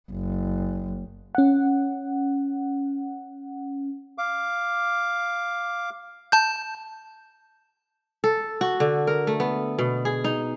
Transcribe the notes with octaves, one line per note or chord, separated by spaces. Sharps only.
F#1
C#4 F#5
F5 D6
A5 G6
A4
F#4
D3
A#4
A3
B3
B2
G#4
D#4